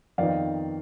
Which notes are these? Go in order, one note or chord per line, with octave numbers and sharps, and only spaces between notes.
F2 D#3 B3 D#4 D5 F5